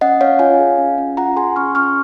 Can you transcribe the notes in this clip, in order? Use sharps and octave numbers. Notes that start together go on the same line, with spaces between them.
C#4 D#5 F#5
C#4 C#5 F5
F4 F5 G#5
G#4
C#4
C#4
F4 F#5 A#5
G#4 G#5 C6
C#4 C#6 F6
C#4 C#6 F6